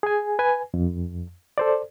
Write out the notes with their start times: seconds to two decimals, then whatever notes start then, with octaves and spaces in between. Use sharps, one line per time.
0.03 G#4 G#5
0.39 B4 G#5
0.74 F2
1.58 A4 C5 D5